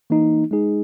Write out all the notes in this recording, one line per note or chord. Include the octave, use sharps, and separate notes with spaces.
E3 A#3 D#4
G#3 D#4 G#4